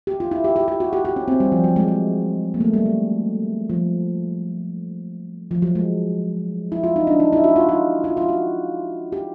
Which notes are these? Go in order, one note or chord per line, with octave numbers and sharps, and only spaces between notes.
G4
F4
E4
G4
G4
G4
F#4
G4
G4
C#4
C4
G3
F3
F#3
G#3
G#3
A#3
A3
G3
F#3
F3
F3
F#3
G#3
E4
F4
D#4
D4
D#4
E4
F#4
F4
F4
F4
F4
F#4
G4